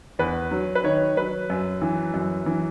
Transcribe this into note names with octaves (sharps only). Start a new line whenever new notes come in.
E2 B4
F#3
B4
D#3 C#5
F#3 B4
F#2
E3
F#2
E3